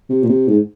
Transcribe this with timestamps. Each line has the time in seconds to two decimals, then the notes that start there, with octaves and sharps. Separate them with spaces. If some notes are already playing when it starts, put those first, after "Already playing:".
0.10 C3
0.23 A#2
0.29 C3
0.48 G#2